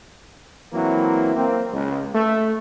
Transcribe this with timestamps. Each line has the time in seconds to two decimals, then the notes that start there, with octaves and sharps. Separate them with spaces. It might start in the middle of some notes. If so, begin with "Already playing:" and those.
0.73 E3 F#3 A#3 C4 E4
1.36 A#3 C4
1.73 C#2
2.14 A3